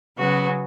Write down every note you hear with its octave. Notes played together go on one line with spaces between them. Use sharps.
C#3 F#3 B3 F#4